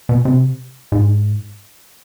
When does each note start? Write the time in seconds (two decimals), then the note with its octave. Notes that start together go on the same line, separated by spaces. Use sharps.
0.09 B2
0.25 C3
0.92 G#2